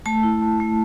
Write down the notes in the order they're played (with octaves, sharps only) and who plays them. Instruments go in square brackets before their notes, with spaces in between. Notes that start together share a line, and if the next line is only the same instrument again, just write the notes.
[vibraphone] A3 A5
E4
A3
A3